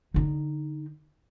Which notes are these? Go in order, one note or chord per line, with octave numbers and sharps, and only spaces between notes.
D3 D#4